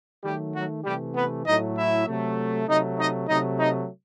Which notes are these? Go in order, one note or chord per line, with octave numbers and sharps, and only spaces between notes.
D#3 F#3 G3 A3 G4
F#3 F#4
C3 E3 G3 A3 G4
B3 B4
A2 F#3 A3 D#4 D#5
E4 E5
C3 F#3 A3
C3 F#3 A3 D#4 D#5
D#4 D#5
C3 F#3 A3 D#4 D#5
D#4 D#5